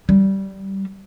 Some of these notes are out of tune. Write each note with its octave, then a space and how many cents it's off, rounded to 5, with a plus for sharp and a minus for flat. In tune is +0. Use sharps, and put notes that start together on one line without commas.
G3 -15